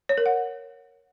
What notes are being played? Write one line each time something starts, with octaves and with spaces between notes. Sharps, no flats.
C#5
A#4
F#5